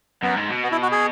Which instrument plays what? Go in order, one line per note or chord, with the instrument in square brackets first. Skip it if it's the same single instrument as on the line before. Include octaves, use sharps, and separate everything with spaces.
[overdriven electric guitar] F#2 [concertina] B3
[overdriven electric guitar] G#2
B2
[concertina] B3
E4
F#4
G#4